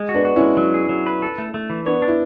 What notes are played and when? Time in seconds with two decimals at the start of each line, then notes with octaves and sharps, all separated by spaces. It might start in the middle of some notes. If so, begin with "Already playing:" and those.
Already playing: G#3
0.09 F#4
0.14 B3 D4
0.25 F#4
0.36 G#3 C#4 E4
0.57 F#3
0.74 G#4
0.89 F#3
1.06 B4
1.22 A4
1.38 A3
1.54 A3
1.70 E3
1.86 B3 D4 C#5
2.02 D4
2.08 E4